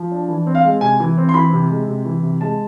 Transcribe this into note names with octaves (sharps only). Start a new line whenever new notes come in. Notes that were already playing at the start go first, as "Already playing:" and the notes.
Already playing: F3
D4
E3
C4
F5
G#3
C3 G#5
E3
C4
C6
E3 B5
C3
G#3
C3
E3
C3
G#3 A5